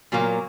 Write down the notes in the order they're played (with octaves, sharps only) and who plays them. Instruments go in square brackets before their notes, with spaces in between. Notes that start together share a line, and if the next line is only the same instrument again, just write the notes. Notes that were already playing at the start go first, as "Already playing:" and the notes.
[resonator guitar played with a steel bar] A#2 F#3 A#3